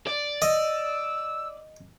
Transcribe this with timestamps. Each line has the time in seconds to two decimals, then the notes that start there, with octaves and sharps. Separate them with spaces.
0.07 D5
0.42 D#5 E6